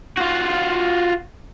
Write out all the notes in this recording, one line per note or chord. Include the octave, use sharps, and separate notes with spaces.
F4 F#4